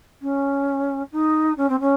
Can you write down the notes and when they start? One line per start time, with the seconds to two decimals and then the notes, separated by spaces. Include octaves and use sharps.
0.21 C#4
1.12 D#4
1.57 C#4
1.69 C4
1.80 C#4